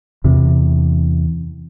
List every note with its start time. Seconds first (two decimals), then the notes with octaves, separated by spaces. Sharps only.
0.24 E2 C3